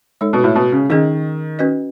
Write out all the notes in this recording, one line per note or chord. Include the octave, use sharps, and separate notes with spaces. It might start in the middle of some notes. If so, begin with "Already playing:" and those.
G#3 D#4 A4 C#5
B2
A2
B2
C#3
D#3 C#4 G#4 D#5
C#4 F#4 B4 D#5